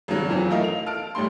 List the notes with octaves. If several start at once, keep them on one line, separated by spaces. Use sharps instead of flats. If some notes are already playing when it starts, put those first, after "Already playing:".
G#1 C#3 F#3
F2 E3 F#3
A3 E4 F4 A#4 D#5 F5
F7
A5 F6 D7
A1 G3 A3 C6